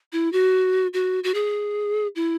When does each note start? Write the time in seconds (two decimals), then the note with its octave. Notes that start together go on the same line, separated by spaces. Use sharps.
0.13 E4
0.33 F#4
0.94 F#4
1.24 F#4
1.34 G#4
2.16 E4